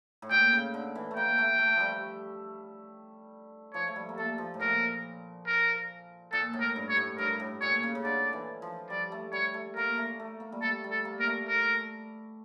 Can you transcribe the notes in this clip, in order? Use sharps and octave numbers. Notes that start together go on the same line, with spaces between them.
A2
A#2 G5
C#3
D3
E3
A3
A#3 G5
A3
A3
F3 G3
F3 C#5
A3
G3
A#3
A3 A4
F3
A2
A#2 A#4
A#4
A#2 A4
A2
A#4
G2
C#5
A2
G2 A#4
A2
A#2 C#5
C#3
C#3
D3 D5
E3
F3
G3 D5
A3
G3 C#5
A3
A#3 A#4
A3
A3
A#3
G3
A3 A4
G3
A4
A#3
A#4
A3
A#4